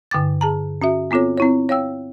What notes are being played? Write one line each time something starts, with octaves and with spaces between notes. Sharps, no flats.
G2 D3 G5 D6 A6
G#4 A5 A#5
C#4 F#4 E5
B3 C4 F4 A4 C#5
C4 E4 C#5
C#5 F5 G5 E6